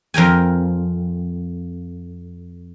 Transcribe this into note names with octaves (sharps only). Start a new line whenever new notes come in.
F2 A#4 G5 G#5